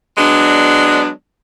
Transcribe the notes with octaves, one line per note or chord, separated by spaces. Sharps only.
F#3 G#3 B3 D4